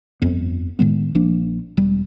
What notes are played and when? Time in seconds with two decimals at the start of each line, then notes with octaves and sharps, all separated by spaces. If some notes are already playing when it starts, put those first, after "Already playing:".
0.22 G1 F2 B3
0.79 A2 D#3 G#3 B3
1.15 A#1 F3 A#3 D4
1.77 E1 G3